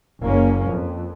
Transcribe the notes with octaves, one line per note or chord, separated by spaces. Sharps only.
F#1 A#3 C#4
F2